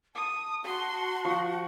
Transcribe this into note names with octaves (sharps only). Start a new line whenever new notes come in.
A5 D#6
F#4 C6
F3 C#6